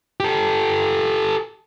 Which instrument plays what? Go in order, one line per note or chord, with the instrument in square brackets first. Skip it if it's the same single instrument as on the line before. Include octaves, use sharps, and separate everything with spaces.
[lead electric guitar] G4 A4